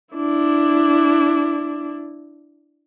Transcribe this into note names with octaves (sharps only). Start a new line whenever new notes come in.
D4 E4